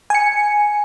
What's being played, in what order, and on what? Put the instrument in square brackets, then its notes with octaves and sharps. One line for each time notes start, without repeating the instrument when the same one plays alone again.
[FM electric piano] G#5 C#7